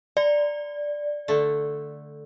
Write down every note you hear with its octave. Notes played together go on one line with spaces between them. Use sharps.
D5 A#5
D3 A3